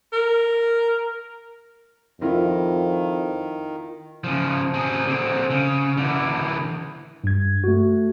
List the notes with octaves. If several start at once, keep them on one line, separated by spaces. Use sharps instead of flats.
A#4
F2 D#3 E4 F4 A#4
C#3 F3
C4 G#4
D3 C4
C#3
D3 E3
G2 G#6
A3 F#4